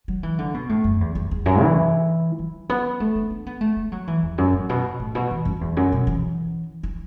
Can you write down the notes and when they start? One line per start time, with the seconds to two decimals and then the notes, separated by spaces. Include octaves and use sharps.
0.08 F#3
0.23 E3
0.39 D3
0.54 B2
0.69 A2
0.84 F#2
1.01 E2
1.15 E2
1.31 E2
1.46 F#2
1.61 E3
2.39 F#3
2.69 B3
3.00 A3
3.15 D4
3.30 D4
3.46 B3
3.61 A3
3.76 A3
3.92 F#3
4.07 E3
4.23 E2
4.38 F#2
4.53 A2
4.69 B2
5.00 A2
5.15 B2
5.31 E3
5.45 F#2
5.57 F#2
5.61 E2
5.77 F#2
5.92 B2
6.07 E3
6.83 E3